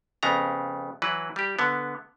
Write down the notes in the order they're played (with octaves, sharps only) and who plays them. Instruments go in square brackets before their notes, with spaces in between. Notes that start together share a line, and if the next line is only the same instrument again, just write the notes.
[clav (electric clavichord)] F2 C#3 B3 A#5
E3 F#3 B4
G3 G4
D3 B3